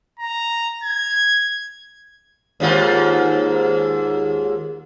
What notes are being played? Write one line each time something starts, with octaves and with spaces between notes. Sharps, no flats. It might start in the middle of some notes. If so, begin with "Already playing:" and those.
A#5
G#6
D#2 G#2 F4